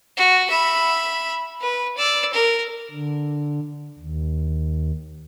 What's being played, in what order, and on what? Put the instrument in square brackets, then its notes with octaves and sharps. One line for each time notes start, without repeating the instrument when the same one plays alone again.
[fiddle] F#4
E5 B5
B4
D5 E6
A#4
[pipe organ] D3
D#2